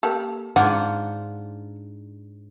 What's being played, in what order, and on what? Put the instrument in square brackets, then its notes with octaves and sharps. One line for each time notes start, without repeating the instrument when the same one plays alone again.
[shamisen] A#3 G4 A4
[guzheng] G#2 D4 F4 [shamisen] F#5